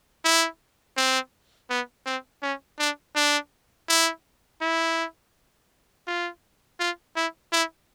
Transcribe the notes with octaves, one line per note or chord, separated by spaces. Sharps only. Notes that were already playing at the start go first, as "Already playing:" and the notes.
E4
C4
B3
C4
C#4
D4
D4
E4
E4
F4
F4
E4
E4